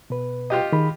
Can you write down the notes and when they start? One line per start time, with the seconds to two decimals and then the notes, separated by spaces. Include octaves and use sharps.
0.10 B2 B4
0.50 F4 G4 D#5
0.72 D#3 G#4 B5